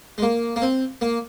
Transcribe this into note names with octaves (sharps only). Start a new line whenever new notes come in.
G#3
A#3
A#3
C4
A#3